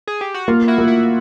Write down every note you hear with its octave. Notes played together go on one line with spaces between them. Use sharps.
G#4
G4
F#4
A#3 F4
E4 F#4
A#3
E4 F#4